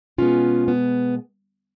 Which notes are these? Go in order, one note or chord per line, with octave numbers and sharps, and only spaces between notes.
B2 G#3 B3 C#4 F4
B3